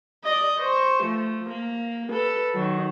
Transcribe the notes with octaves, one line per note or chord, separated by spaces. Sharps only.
D5 D#5
C5 C#6
F3 A3
A#3
A4 B4
D#3 F#3